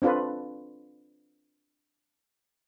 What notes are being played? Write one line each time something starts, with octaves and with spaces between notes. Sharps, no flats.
C4 D4 F4 A4 B4